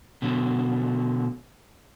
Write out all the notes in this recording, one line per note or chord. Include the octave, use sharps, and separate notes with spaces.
B2 D3 F#3